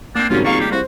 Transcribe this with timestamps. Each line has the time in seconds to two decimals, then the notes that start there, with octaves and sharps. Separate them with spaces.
0.15 A#3 C4 D4
0.30 G#1 C#2 G#2 F#3 G3 C#4 F4 A#4
0.45 C#2 G3 A#3 F5 C#6
0.61 G4
0.72 C2 F#4 C5